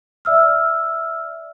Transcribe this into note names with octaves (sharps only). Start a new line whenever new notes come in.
D5 E5 E6 F6